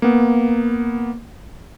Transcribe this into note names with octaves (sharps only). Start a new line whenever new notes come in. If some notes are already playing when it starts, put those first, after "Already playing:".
A#3 B3